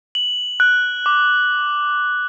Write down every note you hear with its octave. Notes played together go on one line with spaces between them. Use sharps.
F#7
F#6
D6